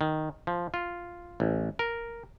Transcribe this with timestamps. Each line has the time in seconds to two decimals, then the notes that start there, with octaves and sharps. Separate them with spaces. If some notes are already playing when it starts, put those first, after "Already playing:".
0.01 D#3
0.47 F3
0.74 F4
1.40 A1
1.79 A#4